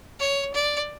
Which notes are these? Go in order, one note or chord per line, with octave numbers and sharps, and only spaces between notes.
C#5
D5